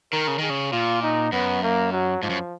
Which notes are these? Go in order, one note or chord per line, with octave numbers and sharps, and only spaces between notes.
D#3 A#4
C#3
D#3 G#4
C#3
A#2 F4
D#4
F#2 B3
A#3
F#3
G#2 F3
F#2